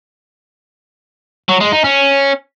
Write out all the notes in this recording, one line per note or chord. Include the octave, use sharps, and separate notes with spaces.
F#3
G#3
D#4
C#4